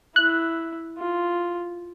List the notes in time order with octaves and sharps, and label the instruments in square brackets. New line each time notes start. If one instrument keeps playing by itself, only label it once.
[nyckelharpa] E4 [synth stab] F#6
[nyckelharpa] F4